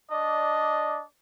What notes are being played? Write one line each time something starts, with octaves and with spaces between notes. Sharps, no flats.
D4 D5 D#5